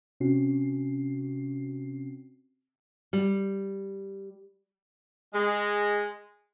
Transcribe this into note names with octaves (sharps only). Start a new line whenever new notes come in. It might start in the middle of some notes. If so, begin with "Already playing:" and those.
C3 C4 C#4 F#4 C7
G3
G#3